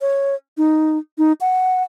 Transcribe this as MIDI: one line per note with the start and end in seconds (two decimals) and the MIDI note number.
0.01 0.35 73
0.58 0.98 63
1.18 1.32 63
1.41 1.83 78